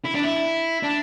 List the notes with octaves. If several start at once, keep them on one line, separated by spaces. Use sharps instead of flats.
E4
D4
E4
D4